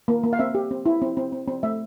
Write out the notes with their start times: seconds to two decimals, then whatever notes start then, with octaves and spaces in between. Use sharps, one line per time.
0.08 A#3
0.23 A#3
0.33 F5
0.39 C4 E5
0.55 G4
0.71 C4
0.86 E4
1.02 C4
1.17 C4
1.32 C4
1.48 C4
1.63 A3 E5